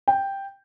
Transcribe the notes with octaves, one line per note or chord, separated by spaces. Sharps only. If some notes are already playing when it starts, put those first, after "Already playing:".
G5